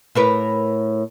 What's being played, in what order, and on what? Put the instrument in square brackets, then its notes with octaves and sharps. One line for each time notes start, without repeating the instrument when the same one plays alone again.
[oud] A2 A#4 B4